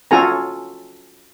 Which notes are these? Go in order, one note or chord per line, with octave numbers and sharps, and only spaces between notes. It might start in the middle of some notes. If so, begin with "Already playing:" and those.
C#4 F4 F#4 A4 G#5 A#5